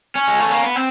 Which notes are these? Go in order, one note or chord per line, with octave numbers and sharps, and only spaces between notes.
C#4
G#3
A3
A#3
B3
C4